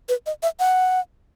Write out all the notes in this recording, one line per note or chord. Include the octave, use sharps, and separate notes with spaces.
B4
D#5
E5
F#5